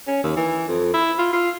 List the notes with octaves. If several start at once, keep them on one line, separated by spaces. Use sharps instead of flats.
C#4
D#2
E3
F2
E4
F4
F4